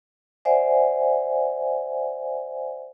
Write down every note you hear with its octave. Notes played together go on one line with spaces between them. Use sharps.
C5 D5 E5 F#5 G#5